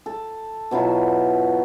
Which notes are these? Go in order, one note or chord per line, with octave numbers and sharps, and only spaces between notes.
A4
B2 F#3 E4 F4